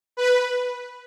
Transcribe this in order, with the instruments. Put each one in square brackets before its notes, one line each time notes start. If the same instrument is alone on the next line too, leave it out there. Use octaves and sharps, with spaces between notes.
[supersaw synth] B4